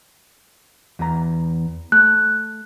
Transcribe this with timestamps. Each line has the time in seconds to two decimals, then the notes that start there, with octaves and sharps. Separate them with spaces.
0.99 E2 A#5
1.92 A3 F#6